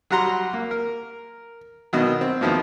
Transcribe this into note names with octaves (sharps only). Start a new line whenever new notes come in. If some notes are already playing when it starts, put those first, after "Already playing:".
F#3 G3 F#5 A#5 C6
A#3
A#4
B2 D#3 F#3
C4
E2 D#3 F3 F#3 A#3